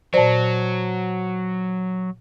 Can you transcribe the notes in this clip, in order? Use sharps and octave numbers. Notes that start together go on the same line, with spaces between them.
A#2 F#3 C5 D5 A5